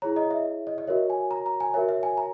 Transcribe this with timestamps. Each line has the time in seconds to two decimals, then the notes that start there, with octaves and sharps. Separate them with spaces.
0.02 E4 G#4 C#5 A#5
0.16 D#5
0.31 E5
0.67 D#5
0.78 D#5
0.87 F#4 A#4 C#5 E5
1.10 G#5
1.31 A#5
1.46 A#5
1.60 G#5
1.74 F#4 A#4 C#5 E5
1.89 E5
2.03 G#5
2.17 A#5